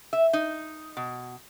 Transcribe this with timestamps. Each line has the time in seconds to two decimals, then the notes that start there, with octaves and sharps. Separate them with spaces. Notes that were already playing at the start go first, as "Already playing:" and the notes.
0.13 E5
0.33 D#4
0.97 B2